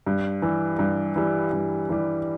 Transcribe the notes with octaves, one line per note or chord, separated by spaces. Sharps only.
G2
E3 G3
G2
E3 G3
G2
E3 G3